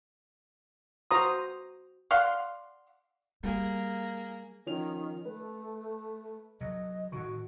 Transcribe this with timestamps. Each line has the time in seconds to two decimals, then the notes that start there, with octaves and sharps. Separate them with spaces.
1.11 F#4 C5 A#5 C6 D#6
2.11 D5 F5 F#5 C6
3.43 G3 A#3 G#4
4.66 D#3 F3 C#4 F7
5.25 A3 B4
6.61 C3 F#3 D#5
7.12 A2 D#3 F#4 C#6